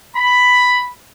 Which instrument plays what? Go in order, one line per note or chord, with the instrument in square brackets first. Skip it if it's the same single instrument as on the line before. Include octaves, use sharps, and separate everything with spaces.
[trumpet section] B5